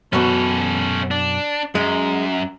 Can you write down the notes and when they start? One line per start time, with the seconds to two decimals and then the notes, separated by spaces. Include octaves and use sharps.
0.13 F#2 B2 C#4 A4
1.11 D4
1.75 F#2 G#3